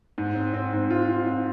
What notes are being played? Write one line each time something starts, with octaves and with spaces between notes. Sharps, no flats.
G#2
C4
C4
G#2
F4
F4
C4